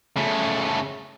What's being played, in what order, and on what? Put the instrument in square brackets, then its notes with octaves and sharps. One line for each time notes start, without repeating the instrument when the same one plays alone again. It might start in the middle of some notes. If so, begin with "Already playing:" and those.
[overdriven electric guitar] C#3 A3